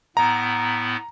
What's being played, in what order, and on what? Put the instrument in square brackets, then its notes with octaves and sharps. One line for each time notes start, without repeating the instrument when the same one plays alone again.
[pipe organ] A2 B3 E4 [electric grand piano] A#5